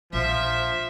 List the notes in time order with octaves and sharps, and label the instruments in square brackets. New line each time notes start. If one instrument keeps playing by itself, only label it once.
[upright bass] A#1 [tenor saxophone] F3 [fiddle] E5